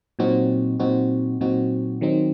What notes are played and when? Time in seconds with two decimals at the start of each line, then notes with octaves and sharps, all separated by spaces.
0.19 A#2 F#3 C4 D#4 F#4
0.79 A#2 F#3 C4 D#4 F#4
1.41 A#2 F#3 C4 D#4 F#4
2.01 D#3 F#3 C4 D#4